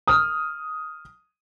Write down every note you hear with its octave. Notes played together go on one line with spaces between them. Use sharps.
D#6 F6